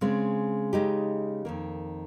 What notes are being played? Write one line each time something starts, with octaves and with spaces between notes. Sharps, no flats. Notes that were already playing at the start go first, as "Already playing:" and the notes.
C#3 G#3 C4
C#3 G#3 D#4 G4
F2 D#3 A#3